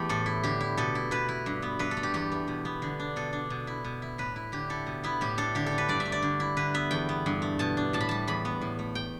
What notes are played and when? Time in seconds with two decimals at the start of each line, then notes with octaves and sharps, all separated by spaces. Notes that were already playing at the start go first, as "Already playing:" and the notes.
Already playing: E2 A3 G4
0.09 A2 A4
0.26 E4
0.43 D3 G4
0.61 E4
0.77 B2 A4
0.95 E4
1.11 B2 B4
1.29 E4
1.46 G2
1.62 B3
1.79 G2 B4
1.91 A4
1.97 A3
2.03 G4
2.14 E2 G4
2.32 A3
2.48 B2
2.65 B3
2.82 D3
2.99 D4
3.16 B2 A4
3.33 D4
3.50 B2
3.67 E4
3.85 B2
4.02 E4
4.18 A2 B4
4.36 E4
4.52 D3 G4
4.70 E4 A4
4.87 B2
5.04 B3 E4
5.21 A2 G4
5.37 D4 A4
5.55 D3 G4
5.66 A4
5.71 D4
5.78 B4
5.89 G2 D5
6.00 E5
6.05 A3
6.12 D5
6.22 D3
6.40 E4
6.57 D3 B4
6.74 B3 E5
6.91 E2 G5
7.09 B3
7.26 G2
7.42 A3
7.59 B2 A5
7.77 D4
7.93 A2 A5
8.01 B5
8.09 G3 A5
8.27 E2 B5
8.45 B3
8.61 A2
8.79 A3
8.95 G5